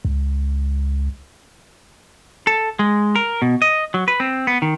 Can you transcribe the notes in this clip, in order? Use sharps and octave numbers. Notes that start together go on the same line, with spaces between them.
C#2
A4
G#3
A#4
B2
D#5
F#3
B4
C4
B3
D#3